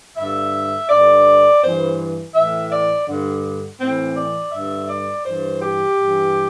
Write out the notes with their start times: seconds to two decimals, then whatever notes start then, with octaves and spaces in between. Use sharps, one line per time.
0.17 G2 D3 E5
0.89 G2 D3 D5
1.61 G2 E3 C5
2.34 A2 E3 E5
2.71 D5
3.07 G2 D3
3.79 A2 E3 C4
4.15 D5
4.52 G2 D3 E5
4.89 D5
5.24 G2 E3 C5
5.61 G4
5.98 G2 E3